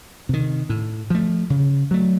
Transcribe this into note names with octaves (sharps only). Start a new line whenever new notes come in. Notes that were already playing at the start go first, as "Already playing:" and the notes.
C3 D#3
A2
F3 A3
C#3
F#3 A3